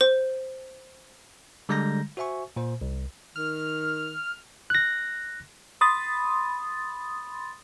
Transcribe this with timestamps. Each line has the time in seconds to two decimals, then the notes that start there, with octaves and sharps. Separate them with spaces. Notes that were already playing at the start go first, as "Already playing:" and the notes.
0.01 C5
1.69 D3 G3 G#3 A#5 G6 A#6
2.17 F#4 C5 E5 G#5 C#6
2.56 A#2 C5
2.81 C2
3.36 D#3 F6
4.70 F#6 A#6
5.81 B5 C6 D#6 A6